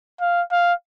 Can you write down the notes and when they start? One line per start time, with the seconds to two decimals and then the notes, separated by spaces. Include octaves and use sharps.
0.21 F5
0.52 F5